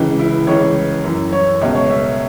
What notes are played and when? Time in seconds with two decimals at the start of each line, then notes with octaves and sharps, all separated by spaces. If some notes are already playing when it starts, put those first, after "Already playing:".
Already playing: C#2 C#3 E3
0.19 E4
0.47 C#2 C#3 E3 C#5
1.04 F#2 E3
1.33 C#5
1.61 C#2 B2 E5
1.75 C#5
1.89 E5